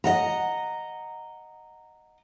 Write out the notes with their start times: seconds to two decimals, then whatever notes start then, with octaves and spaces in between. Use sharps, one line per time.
0.04 D#5 F#5 A#5